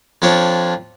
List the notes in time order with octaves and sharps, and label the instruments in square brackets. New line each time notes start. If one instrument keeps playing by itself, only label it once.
[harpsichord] F2 F3 D4 C#5